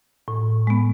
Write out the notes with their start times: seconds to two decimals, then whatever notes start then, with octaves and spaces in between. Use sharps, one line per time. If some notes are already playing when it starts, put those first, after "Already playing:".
0.28 A2
0.67 G#3 B3